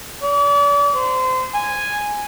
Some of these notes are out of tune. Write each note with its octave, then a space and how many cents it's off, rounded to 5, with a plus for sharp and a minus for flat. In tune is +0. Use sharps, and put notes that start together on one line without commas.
D5 -40
C5 -30
G#5 -5